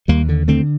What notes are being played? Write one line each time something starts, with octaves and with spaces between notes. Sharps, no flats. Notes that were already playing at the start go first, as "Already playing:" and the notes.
D#2 G3 A#3
D3
D3 A3 C4